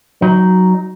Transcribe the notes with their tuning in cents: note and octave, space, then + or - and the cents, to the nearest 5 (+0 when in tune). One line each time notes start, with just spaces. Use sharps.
F#3 +0 D#4 +0